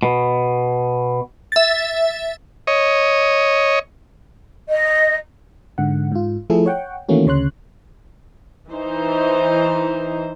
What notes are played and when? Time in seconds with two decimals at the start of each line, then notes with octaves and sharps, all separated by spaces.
0.03 B2
1.52 E5 A6
2.67 C#5 D#5
4.70 D#5
5.78 G#2 D3 F#5
6.12 G#2 F4
6.50 F3 A3 E4 G#4 A4
6.66 C#5 F#5 G5
7.09 D#3 E3 A3 A#3 C#4 F#4
7.26 D2 C#3 C#5 C6 F#6
8.70 E3 D#4 C5